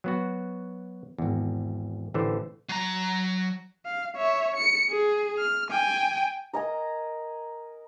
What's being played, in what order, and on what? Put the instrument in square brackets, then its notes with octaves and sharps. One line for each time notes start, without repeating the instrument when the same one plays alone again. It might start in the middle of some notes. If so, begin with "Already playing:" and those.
[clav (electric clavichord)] F#3 B3 F#4
G#1 E2
A1 D3 E3 A3 C5
[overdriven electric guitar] F#3 A#5
[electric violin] F5
C#5 E5
C#7
G#4
F6
G5 G#5
[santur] A#4 D#5 G#5 A#5